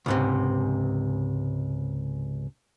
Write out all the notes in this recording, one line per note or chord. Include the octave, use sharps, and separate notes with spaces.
C#2 G#2 C3